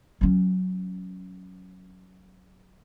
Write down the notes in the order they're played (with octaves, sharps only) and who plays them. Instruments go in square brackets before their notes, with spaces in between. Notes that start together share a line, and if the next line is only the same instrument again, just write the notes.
[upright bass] F#3 C#4